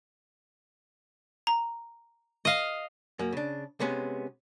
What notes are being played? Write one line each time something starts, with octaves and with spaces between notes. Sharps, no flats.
A#5
D#5 F5
F#2 A#3
C#3 D4
C3 G#3 B3 C#4